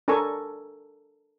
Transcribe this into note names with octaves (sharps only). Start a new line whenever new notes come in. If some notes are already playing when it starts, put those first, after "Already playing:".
D4 A4 A#4 G#5 C#6